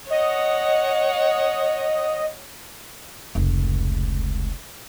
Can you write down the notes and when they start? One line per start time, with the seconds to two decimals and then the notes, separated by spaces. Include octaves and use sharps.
0.10 C#5 D#5 F#5
3.35 F1 C#2